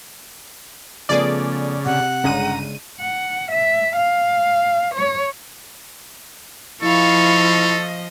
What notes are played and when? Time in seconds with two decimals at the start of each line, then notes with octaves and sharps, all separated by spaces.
1.09 C#3 F3 A3 B3 G#4 D5
1.86 C3 F#5
2.24 G1 C#3 G#3 A#5 D#7
3.00 F#5
3.52 E5
3.96 F5
4.94 C#5
6.82 F3 E4 A4 D#5 F5 C#6